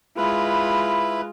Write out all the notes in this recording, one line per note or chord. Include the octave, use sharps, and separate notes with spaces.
G#3 E4 F4 B4 B5